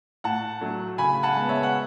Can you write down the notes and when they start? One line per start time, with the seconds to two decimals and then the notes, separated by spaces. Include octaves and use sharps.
0.24 A2 F#5 A5
0.61 F#3 A3 D4
0.98 C#3 G#5 B5
1.23 F#5 A5
1.37 G#3 B3
1.49 C#5 E5
1.63 F#5